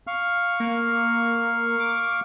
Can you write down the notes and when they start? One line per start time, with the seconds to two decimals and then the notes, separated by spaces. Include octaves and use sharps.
0.07 F5 C#6 F6
0.60 A#3
1.79 D6